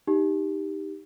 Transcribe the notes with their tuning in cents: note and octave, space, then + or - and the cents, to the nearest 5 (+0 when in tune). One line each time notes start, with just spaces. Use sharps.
D#4 +0 G4 +0